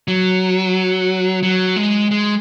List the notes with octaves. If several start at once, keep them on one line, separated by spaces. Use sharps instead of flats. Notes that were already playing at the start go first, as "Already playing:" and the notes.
F#3
F#3
G#3
G#3